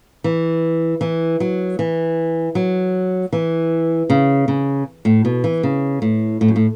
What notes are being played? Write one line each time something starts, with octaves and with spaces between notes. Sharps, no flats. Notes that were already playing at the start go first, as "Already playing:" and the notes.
E3
E3
F#3
E3
F#3
E3
C#3
C#3
A2
B2
E3
C#3
A2
A2
F#2
A2